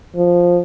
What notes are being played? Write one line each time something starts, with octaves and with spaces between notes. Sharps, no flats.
F3